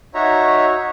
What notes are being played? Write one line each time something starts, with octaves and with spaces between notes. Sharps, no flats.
D#4 F#4 C#5 E5 A#5